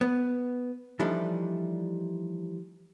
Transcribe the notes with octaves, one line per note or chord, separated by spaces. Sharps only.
B3
E3 F3 G3 A3 D4 D#4